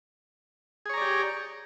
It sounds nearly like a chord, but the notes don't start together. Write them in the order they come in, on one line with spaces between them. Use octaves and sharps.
G#4 C#5 A#5 D5 G4